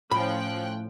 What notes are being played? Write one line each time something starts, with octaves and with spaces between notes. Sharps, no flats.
A2 F3 C#4 G5 B5 F#6